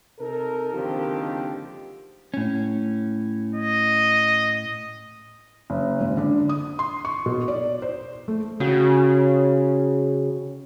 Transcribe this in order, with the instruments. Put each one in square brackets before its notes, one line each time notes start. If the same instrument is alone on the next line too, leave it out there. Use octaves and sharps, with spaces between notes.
[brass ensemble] C3 D#4 A4 A#4
F#1 D3 D#3 F3 C4 G4
[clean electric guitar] A2 C#4
[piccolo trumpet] D#5
[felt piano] F#1
G#1
D3
D#6
C6
C#6
B2
D5
C5
A3
[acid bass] C#3 [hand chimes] C#4 F#4